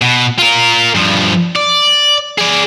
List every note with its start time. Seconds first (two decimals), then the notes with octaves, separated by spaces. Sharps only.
0.02 B2
0.39 F4 A#4
0.95 G2 F3
1.56 D5
2.38 G#4 D5